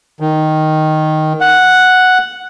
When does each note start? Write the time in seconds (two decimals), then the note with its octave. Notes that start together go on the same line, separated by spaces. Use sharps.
0.20 D#3
1.41 F#5